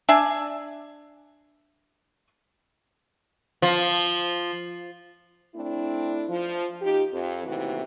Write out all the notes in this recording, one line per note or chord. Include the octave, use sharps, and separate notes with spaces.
D4 D5 E5 G#5
F3
A3 C4 D4 E4
F3
D#4 F4 G4
F2
D#2 A2 C3 E3 F#4